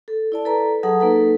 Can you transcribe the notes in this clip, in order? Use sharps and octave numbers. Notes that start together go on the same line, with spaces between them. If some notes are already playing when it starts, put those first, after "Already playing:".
A4
E4 D5 A5
A4 B4 D5 A#5
F#3 G#4 A4 F#5 A5 D#6
A#3 D#4 A4 B4